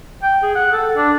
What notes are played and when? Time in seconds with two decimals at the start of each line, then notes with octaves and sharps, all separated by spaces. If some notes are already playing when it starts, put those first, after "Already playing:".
0.22 G5
0.42 G#4
0.55 F#5
0.72 A4
0.96 D4